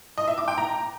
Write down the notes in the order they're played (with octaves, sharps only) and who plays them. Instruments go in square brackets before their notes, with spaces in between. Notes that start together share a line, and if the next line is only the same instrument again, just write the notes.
[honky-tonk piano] D#5
E5
D6
G5
A#5